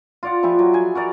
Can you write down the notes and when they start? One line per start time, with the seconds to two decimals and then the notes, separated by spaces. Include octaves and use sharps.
0.23 F4 D5 F#5
0.43 F3 E4 G4 G#4
0.59 F#3
0.73 G#4 G#5
0.95 F#4 A#4 D5